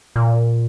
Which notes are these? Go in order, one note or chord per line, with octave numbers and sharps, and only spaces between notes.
A#2